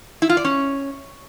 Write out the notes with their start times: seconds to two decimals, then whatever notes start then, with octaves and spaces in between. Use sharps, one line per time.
0.22 E4
0.29 F4
0.37 D5
0.44 C#4